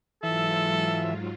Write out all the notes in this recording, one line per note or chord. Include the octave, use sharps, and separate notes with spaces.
G#2 E3 F#3 F4 A4 E5